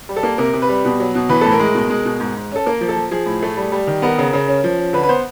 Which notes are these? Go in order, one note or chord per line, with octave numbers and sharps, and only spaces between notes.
G3
A4
A#3
C3 A#4
C3
B4
G3
B2
F#3
B2
E3 B4
A2 A4
A#4
G#3
B2
G#3
B2
G#2
G#2
C#4 A4
A#3 A#4
F3
A4
F3
F3 G#4
A2
A3
G3
G3
D#3
B3 A#4
C#3
C#3
C#4
F3
C#4
D3 B4
B4
B3 C5